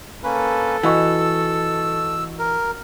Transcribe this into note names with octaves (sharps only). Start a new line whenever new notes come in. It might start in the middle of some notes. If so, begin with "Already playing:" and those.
A#3 C#4 A4 B4
E3 F#4 D#5 C#6 E6
A#4